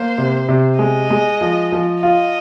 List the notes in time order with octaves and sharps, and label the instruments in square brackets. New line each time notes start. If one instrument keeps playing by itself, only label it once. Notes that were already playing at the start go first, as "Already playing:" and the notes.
Already playing: [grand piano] A#3 [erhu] C5
[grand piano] C3
C3
[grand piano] G#3 [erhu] D#5
[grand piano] G#3
F3
F3
[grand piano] F4 [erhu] D#5